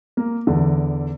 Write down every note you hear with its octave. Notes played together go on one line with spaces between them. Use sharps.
A#3
E2 D3